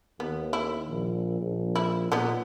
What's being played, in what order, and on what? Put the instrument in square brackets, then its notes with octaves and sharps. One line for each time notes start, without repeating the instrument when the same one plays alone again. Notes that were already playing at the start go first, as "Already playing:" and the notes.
[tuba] D#2 [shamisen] B3
[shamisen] E4
[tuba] A#1
A#1
[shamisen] E4
[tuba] A#2 [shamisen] F#3 B3 D#4